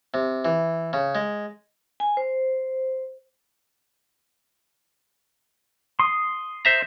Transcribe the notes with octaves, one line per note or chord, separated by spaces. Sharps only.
C3
E3
C#3
G#3
G#5
C5
C6 D#6
C5 E5 A#5